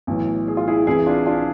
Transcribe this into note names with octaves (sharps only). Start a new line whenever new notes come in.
B1 A2 E3
G#4
F4
E4 G#4
C2 C3 E3 E4 G#4
D4 F4
D4 F4